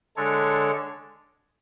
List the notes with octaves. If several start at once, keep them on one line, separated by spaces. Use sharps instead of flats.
D3 G#3 D4 A4 C#5